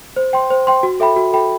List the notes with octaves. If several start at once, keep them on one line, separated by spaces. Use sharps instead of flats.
C5
G5 C6
C5
G5 C6
F#4
A4 E5 G5 B5
F#4
A4 E5 G5 B5